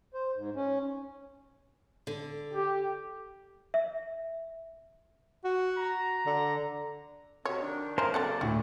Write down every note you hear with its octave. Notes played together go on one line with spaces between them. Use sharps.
C5
G#2
C#4
D3
G4
E5
F#4
A#5
D3
C3 F#4 C#5 D#5
D#3 D4
E3 F3 C#4 A#4 C5
C#3 F#3 A#3 C4 A4 D5 F#5
D2 A2 F#4